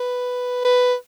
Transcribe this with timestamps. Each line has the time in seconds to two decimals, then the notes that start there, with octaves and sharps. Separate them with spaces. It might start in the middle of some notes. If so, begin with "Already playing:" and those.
Already playing: B4
0.65 B4